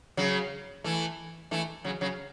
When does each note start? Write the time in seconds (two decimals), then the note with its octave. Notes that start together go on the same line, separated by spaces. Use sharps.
0.17 C#3 F#3
0.84 E3 A3
1.51 E3 A3
1.85 C#3 F#3
2.01 C#3 F#3